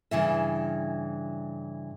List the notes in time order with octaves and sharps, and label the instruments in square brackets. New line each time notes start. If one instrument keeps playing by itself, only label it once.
[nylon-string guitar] G2 C#3 E3 E5